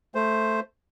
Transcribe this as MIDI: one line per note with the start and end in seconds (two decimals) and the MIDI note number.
0.15 0.60 57
0.15 0.60 72